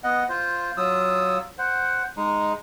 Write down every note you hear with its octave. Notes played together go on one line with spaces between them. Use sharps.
B3 D#5 F#5
F4 C5
F#3 F4 D#6 E6
C5 F#5
G#3 D#4